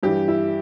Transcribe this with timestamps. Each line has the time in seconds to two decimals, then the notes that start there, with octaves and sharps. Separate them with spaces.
0.03 G2 E3 G4
0.28 E4